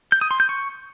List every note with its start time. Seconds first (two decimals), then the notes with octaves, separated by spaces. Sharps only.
0.12 G6
0.21 D#6
0.31 C6
0.40 G6
0.49 C#6